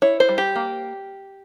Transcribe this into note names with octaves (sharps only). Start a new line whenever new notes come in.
E4 C#5
C5
G3
G4
A#3